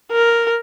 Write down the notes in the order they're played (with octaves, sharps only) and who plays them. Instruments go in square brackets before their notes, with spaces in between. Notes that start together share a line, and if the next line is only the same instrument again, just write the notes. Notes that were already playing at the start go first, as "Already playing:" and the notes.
[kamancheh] A#4